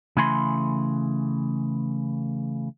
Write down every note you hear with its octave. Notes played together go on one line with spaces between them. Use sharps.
C#3 E3 A3 G#5 B5 C6